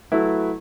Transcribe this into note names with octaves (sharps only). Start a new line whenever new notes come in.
F#3 A3 E4 B4